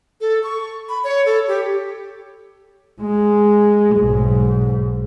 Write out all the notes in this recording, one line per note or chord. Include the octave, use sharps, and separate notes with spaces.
A4
C#6
B5
C#5
A4
G4
G#3
B1 G#2